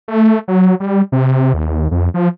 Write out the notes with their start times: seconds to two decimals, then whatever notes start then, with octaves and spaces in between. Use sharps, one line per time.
0.08 A3
0.48 F#3
0.80 G3
1.12 C3
1.54 D#2
1.91 F2
2.14 F3